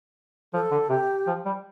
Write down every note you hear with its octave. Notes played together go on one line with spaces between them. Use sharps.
F3 A4
D3
C3 G4
F3
G3